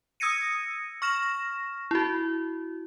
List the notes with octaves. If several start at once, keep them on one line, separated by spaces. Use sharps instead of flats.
D#6 E6 G#6 A#6 C#7 D#7
C#6 F6 A#6 E7
E4 F#4